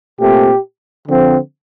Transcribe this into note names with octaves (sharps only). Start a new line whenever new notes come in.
A#2 A3 C4 G4
D3 F3 C4